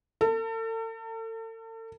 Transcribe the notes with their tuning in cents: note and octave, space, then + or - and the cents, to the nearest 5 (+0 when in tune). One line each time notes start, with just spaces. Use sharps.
A4 +40